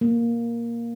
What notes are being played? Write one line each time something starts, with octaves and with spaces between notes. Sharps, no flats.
A#3